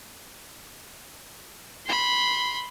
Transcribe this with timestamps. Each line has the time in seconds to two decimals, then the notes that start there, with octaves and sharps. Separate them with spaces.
1.86 B5 C6